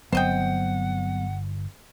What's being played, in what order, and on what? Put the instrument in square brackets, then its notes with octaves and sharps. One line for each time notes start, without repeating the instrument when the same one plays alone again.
[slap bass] G1 [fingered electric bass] F#3 B3 C4 [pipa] C5 D#5 G5 [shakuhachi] F#5